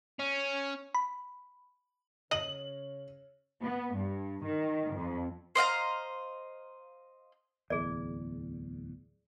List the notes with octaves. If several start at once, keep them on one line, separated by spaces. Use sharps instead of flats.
C#4
B5
C#3 C#5 D#5 F#7
B3
G2
D#3
F2
C5 D#5 F5 A#5
D1 E2 G#4 D5